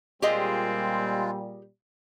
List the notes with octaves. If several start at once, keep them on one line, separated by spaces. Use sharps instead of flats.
A#2 G3 G#3 C4 F4 G4 G#4 D#5